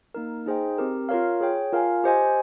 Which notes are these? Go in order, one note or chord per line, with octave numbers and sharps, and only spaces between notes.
A#3 D#4 A#4
D#4 G#4 C5 D#5 G5
C4 G4 A#4
F4 A#4 C#5 F5
G#4 C#5 G5
F4 A#4 F5 G#5
G4 C5 D#5 G#5